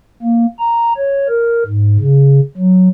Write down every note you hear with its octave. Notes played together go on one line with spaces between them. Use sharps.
A#3
A#5
C#5
A#4
G#2
C#3
F#3